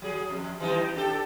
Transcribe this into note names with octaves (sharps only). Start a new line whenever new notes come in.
F#3 G#4
F2
E3 G3 D#4
D4 G4 A4